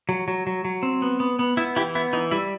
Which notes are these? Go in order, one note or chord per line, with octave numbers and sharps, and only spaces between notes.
F#3
F#3
F#3
F#3
C4
B3
B3
B3
B3 E4
E3 E4 G4
B3 E4
E3 D#4
G3 E4